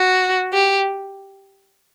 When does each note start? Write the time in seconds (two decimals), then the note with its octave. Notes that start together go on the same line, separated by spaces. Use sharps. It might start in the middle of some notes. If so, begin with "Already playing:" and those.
Already playing: F#4
0.53 G4